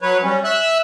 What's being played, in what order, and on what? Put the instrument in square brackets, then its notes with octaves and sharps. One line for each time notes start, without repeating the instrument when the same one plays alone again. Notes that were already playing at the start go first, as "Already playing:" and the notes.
[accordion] F#3 B4 C#5
G3 C#4
E5 E6 F#6